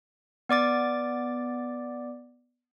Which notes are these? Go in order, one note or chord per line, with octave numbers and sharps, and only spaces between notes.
B3 D5 D6 A6